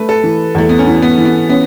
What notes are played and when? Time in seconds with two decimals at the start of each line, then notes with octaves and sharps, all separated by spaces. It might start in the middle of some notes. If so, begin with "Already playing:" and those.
Already playing: A3 B4
0.09 A4
0.24 E3
0.55 E2 A3
0.69 B3
0.79 C#4
0.87 E3
1.02 B3
1.18 E3
1.25 B3
1.49 B3 C#4